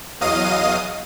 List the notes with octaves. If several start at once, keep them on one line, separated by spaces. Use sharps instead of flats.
E2 F#3 D#5 F5 D#6 D#7